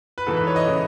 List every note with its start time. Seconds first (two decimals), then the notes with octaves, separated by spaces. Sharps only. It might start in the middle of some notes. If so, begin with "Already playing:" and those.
0.18 B4
0.27 G#2 E3 A4
0.37 B4
0.47 C#5
0.56 D#5
0.67 C#3 E3